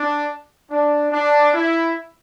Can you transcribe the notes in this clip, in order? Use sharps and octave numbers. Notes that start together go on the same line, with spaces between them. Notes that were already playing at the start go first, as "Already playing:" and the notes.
Already playing: D4
D4
D4
E4